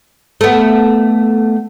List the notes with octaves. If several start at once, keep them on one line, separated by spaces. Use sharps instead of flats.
A3 B3